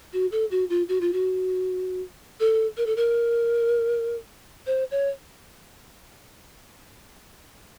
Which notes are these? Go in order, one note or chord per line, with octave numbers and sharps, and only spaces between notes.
F#4
A4
F#4
F4
F#4
F4
F#4
A4
A#4
A4
A#4
C5
C#5